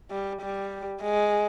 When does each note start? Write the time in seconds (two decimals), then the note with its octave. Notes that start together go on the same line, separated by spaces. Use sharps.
0.10 G3
0.41 G3
1.02 G#3